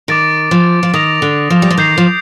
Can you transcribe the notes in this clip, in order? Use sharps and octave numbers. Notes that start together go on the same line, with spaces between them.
D#3 D6 A6 D7
F3
F3
D#3 D#6 A#6 F7
D3
F3
G3
F3
D#3 G6 C7 F7
F3